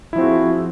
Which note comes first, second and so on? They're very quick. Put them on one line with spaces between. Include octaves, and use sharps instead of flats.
E4 F3 C4 F#4 G#4